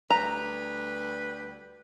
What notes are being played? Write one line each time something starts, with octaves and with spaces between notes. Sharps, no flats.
D2 G3 B4 A#5